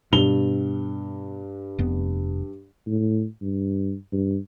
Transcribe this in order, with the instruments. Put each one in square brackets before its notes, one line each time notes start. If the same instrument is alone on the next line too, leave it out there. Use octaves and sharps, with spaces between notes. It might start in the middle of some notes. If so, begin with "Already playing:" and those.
[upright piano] G2 F7 G7 [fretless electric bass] B2
[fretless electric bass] F1 F2 B3
[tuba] A2
G2
G2